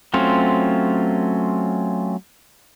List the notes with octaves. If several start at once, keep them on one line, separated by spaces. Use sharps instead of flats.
F#3 A3 C4 C#4 F4